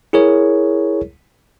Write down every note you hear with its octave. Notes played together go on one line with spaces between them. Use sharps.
E4 G#4 A#4 C#5